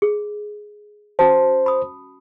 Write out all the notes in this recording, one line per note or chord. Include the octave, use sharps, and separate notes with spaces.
G#4
C#4 F#4 C5 A5
B5 D#6